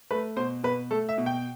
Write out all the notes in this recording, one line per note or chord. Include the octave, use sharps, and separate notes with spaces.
A3 B4
B2 C5
B2 B4
A3 A4
E5
B2
G5